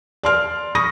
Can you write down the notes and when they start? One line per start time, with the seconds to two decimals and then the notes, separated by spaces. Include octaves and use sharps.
0.23 D5 C6 F6
0.75 B5 C#6 D#6 A#6